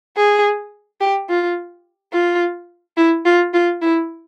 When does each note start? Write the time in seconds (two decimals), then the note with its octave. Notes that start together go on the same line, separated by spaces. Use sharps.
0.17 G#4
1.01 G4
1.29 F4
2.13 F4
2.97 E4
3.25 F4
3.54 F4
3.82 E4